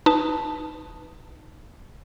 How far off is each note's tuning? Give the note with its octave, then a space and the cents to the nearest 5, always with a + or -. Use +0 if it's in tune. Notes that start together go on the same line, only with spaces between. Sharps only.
D#4 +0 B4 +0 A5 +0